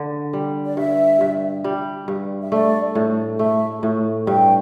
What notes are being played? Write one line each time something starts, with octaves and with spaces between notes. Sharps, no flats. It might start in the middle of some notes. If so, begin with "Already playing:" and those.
Already playing: D3
G3
D5
G2 E5
G2
G3
G2
E5
A3 D5
A2
A3 E5
A2
G2 G5